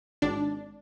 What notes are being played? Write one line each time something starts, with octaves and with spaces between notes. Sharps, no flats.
G#1 D4